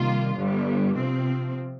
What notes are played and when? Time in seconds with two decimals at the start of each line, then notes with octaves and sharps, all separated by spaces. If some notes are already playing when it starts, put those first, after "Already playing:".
Already playing: C3 D#3 G3 A#3 F4
0.36 G1 G2 D3 G3
0.97 C3 F3 C4